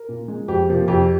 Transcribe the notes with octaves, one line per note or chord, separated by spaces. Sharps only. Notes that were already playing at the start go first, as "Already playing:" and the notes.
Already playing: A#4
A#2
G#3
F2 G4
C3 F3 A#3
F2 G4